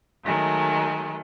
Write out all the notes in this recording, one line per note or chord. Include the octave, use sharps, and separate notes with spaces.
D#3 F#3 G#3 A3